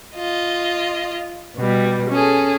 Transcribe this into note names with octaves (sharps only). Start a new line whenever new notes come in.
F4 D#5
B2 G3
C#4 G#4 A4